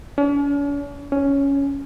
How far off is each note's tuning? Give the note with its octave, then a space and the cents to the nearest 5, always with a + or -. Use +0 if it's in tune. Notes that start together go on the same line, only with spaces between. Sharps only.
C#4 +45
C#4 +5